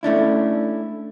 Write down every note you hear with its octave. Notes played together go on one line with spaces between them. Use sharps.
A3 C#4 D4 E4